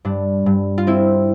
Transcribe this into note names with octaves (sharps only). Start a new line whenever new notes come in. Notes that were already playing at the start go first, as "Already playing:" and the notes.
G2 D4
G2
F4
C4 E4